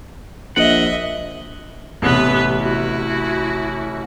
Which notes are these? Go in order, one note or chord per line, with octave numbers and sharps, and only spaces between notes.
A#1 D#5 E5 F#5
A1 C3 B3 B4
E4 F#4